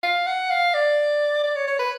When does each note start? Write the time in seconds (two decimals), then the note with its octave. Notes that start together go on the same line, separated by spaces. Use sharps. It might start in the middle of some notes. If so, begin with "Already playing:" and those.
0.03 F5
0.27 F#5
0.50 F5
0.74 D5
1.44 D5
1.56 C#5
1.67 C#5
1.79 B4